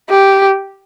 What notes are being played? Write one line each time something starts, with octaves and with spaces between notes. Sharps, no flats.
G4